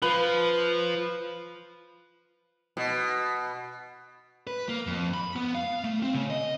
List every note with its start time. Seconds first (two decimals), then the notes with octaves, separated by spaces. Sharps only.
0.02 F3 B4
2.77 B2
4.47 B4
4.69 A#3
4.87 F2
5.14 B5
5.36 B3
5.55 F5
5.84 A3
6.03 C4
6.14 C#3
6.30 D#5